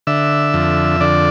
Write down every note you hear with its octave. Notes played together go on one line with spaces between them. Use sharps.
D3 E5
F2
D3 D5